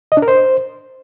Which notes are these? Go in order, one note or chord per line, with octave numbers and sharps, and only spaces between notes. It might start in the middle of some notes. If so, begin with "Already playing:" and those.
D#5
D4
A#4
C5